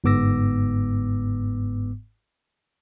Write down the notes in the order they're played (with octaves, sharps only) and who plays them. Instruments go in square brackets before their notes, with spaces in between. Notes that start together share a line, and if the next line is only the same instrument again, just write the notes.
[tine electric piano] G1 G#2 B3 D6 E6 A#6